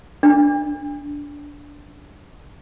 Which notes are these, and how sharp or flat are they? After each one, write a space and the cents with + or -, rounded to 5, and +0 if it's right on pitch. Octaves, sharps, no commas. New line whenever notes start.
D4 -15